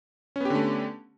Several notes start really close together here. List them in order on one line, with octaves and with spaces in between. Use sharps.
C#4 B3 G4 D3 A3